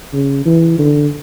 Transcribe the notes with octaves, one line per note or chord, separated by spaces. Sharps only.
C#3
E3
D3